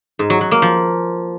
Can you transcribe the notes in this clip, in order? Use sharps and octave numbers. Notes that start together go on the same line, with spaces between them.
G#2
F#3
F#3
A#3
F3